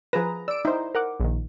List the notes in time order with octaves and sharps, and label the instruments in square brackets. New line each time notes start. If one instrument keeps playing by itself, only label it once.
[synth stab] F3 A#5 [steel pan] G#4 B4 [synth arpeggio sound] A#6
[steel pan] D5 [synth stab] E6 D7
[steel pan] D#4 [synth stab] E4 C5
[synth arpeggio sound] A#4 F#5 D6
A#1 D#3